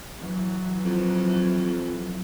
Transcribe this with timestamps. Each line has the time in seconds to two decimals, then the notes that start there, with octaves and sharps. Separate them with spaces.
0.19 E3 F#3
0.84 F2